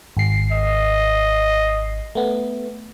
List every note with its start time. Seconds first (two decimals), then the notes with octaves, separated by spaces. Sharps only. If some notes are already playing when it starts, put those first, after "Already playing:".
0.17 G#1 C7
0.52 D#5
2.15 A3 B3